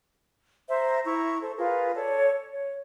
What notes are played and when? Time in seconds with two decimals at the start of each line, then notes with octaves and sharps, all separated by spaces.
0.69 C5 E5 A#5
1.06 E4 A#5 C#6
1.41 A4 C5
1.58 F4 G#4 A#4 B4
1.94 A4 C#5 D5 A5
2.52 C#5